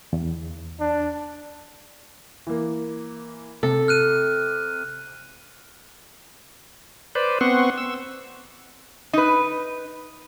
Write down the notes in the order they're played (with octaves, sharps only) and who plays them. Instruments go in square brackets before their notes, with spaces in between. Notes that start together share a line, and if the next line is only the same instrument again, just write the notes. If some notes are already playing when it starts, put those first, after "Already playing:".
[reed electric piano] E2
[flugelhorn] D4
[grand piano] E3 A#3
[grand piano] C3 [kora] A4
[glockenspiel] F6 F#6 D#7
[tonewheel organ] B4 C5 D5
B3 C4 F#5 C6 C#6
E6
[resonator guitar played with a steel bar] D#4 B4